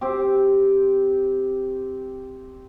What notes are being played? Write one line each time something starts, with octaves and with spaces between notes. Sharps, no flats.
C4 G4